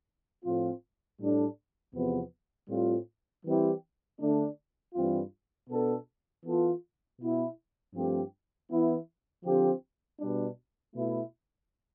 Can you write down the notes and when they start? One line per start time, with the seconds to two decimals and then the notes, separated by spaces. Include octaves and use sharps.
0.44 A2 F3 C4 F4
1.19 A2 G3 D4 A4
1.95 E2 C3 F3 B3
2.69 A2 G3 C4 F4
3.45 E3 G3 C4 E4 G4
4.20 D3 A3 D4
4.95 G2 E3 G3 C4 F4
5.69 B2 B3 D4 A4
6.45 E3 B3 F4 A4
7.20 B2 B3 E4
7.95 G2 F3 A3 C4 G4
8.69 E3 B3 E4
9.45 D3 F3 C4 G4
10.20 B2 G3 D4
10.95 B2 A3 E4